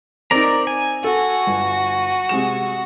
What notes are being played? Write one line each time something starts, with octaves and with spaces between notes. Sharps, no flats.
C4 D#4 A#4 D5 A#5
G#5
F#4 A4
G1
C3 G#3 E7